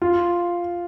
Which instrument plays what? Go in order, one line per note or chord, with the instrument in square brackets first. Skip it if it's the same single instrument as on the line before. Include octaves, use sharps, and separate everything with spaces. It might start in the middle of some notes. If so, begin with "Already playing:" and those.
[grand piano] F4